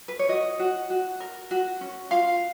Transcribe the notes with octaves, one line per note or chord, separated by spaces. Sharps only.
B4
C#5
F#4 D#5
F#4
F#4
A#4
F#4
C#4
F4 F5